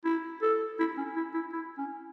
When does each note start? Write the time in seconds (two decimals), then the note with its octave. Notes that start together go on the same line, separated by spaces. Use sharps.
0.05 E4
0.42 A4
0.80 E4
0.98 C#4
1.16 E4
1.34 E4
1.53 E4
1.78 C#4